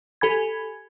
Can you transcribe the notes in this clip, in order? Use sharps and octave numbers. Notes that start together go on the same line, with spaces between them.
G4 A4 G#5 B5 G#6